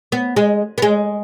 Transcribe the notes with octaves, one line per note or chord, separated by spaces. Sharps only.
B3
G#3
B3
G#3